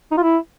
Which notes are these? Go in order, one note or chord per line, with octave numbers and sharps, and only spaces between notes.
D#4
F4
E4